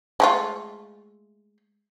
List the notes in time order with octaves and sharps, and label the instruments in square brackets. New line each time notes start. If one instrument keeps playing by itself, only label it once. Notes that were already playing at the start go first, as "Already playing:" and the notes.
[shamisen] G#3 A3 F4